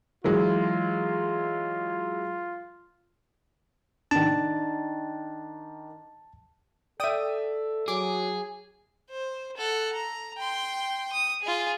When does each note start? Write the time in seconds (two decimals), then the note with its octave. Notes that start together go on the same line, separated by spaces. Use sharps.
0.24 E3 F#3 G#3 F4
4.11 D#3 D4 A5
7.00 A4 D5 E5 G5 D#6 D#7
7.88 F#3 G#4 D6
9.10 C5
9.57 A4 F#5
9.93 A#5
10.38 G5 C6
11.12 D#6
11.42 F4 G#4